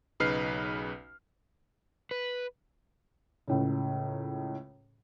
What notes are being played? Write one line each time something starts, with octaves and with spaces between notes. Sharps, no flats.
B1 C#3 D#4 B4 F6 C7
B4
C#2 A2 C#3